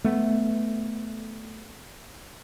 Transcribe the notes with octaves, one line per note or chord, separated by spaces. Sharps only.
A3 B3